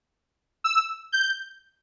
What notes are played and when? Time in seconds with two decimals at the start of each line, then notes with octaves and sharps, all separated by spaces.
0.64 E6
1.12 G6